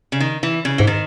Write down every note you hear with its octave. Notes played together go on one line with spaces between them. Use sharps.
C#3
D#3
E3
C#3
G#2 E3
D#3